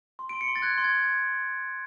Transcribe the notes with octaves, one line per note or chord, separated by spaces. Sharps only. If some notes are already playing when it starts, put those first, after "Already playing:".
C6
D7
C6
C#7
C6
A6
F#6 G#6
C6
G#6